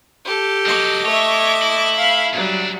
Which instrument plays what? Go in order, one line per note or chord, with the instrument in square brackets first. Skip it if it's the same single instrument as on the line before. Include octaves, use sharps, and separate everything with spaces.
[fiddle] G4 A4
[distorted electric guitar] F#3 G3 [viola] D#5 D6
[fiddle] A3 E5 [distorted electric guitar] C#5
[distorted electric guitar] E4
[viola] F5 B5
[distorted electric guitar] G#2 D4 [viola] F#3 G3